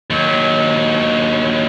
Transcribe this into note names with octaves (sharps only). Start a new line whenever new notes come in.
D#2 F#3